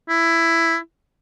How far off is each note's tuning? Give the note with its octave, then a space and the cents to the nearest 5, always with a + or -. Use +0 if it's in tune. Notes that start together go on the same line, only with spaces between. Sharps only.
E4 +10